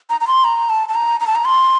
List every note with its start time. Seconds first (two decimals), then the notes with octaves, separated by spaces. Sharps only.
0.10 A#5
0.21 A#5
0.27 C6
0.44 A#5
0.69 A5
0.89 A5
0.95 A#5
1.20 A#5
1.27 A5
1.35 A#5
1.45 C6